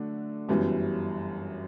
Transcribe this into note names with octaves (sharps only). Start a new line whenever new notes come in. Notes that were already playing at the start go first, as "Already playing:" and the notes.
Already playing: D3 F#3 A3 D4 F#4
G1 F#2 E3 G3